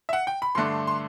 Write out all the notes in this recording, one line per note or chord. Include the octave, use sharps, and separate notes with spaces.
E5
F#5
G5
B5
G2 D3 A3 D4 C6
C6